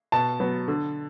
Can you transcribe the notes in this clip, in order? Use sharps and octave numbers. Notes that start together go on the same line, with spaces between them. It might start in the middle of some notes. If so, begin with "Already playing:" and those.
B2 A5
F#3 B3
D3